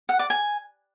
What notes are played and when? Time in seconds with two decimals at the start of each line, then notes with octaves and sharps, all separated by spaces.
0.09 F#5
0.19 D5
0.30 G#5